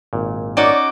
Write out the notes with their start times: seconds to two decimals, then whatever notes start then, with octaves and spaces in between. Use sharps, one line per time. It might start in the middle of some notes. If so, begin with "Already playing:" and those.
0.13 G#1 A#2
0.57 C#4 D#4 F#4 D5 D6